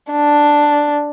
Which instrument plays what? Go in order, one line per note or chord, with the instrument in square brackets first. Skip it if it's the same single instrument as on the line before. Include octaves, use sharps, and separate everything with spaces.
[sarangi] D4